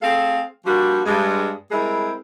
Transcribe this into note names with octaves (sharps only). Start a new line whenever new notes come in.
A3 C4 G#4 A4 F5
F3 G3 A#3 D4 F#4
G2 G#3
G3 G#3 C4 E4 G#4 A#4